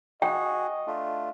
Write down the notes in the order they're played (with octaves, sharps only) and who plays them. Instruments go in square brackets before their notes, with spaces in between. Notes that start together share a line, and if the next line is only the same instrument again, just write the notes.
[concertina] F#4 G#4 [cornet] D#5 [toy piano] G5
[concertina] A3 D4 F4